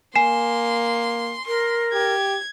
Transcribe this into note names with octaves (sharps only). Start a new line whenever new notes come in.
A#3 G#5 C6 C7 E7
A#4 C6
G4 G#6